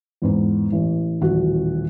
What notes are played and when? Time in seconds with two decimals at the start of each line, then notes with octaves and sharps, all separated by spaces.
0.22 E2 G#2 B3
0.72 A1
1.20 D#1 A1 F#4